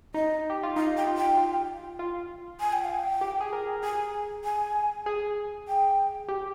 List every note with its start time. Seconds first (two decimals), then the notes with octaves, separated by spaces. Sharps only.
0.14 D#4 D#5
0.50 G4
0.63 F4
0.76 D#4 F5
0.97 G5
1.07 F4
1.17 G5
1.37 F4
1.99 F4
2.60 G#5
2.73 G5
2.85 F5
2.96 G5
3.21 G4
3.41 G#4
3.53 A#4
3.83 G#4 G#5
4.44 G#5
5.06 G#4
5.68 G5
6.29 G4